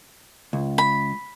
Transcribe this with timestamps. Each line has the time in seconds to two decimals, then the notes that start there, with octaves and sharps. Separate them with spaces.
0.53 C#2
0.78 B5